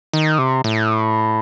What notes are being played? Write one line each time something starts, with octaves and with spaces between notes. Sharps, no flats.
D#3
C3
A2